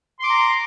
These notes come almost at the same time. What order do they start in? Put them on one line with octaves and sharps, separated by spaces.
C6 D6 A#5